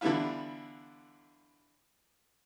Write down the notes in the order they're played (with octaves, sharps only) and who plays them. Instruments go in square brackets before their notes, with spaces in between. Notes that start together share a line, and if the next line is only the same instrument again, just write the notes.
[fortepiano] D3 E3 G3 B3 E4 F4